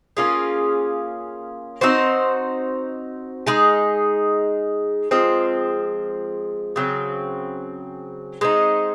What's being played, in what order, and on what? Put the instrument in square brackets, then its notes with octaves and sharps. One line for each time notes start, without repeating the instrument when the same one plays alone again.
[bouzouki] A#3 C#4 F4 G#4
C4 D#4 F#4 C5
G#3 D#4 G#4
F3 G#3 C4
C#3 F#3 C4
G#3 C4 D#4